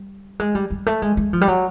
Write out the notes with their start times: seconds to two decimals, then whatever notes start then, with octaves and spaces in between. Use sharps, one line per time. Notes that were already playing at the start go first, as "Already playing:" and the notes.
Already playing: G3
0.40 G#3
0.55 G3
0.70 G3
0.86 A3
1.02 G#3
1.17 G#3
1.33 F3
1.41 G3
1.48 F#3